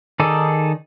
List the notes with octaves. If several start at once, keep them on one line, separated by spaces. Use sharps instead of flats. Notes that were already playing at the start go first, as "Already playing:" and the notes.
D#3 D#4 G#4 A4 D5